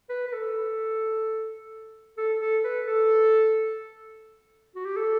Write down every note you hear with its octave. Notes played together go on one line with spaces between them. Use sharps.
B4
B4
A4
A4
A4
B4
A4
F#4
G4
A4